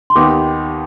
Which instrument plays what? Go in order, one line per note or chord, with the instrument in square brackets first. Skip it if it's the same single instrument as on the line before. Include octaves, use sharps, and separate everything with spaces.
[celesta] C6
[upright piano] D#2 D#3 B3 D#4 G4 [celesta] D6